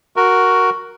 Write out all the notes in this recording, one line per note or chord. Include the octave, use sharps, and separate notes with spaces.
F#4 A#4